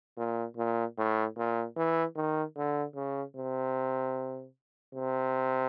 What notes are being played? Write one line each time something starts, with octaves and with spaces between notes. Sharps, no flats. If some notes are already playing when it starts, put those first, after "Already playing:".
A#2
A#2
A2
A#2
E3
D#3
D3
C#3
C3
C3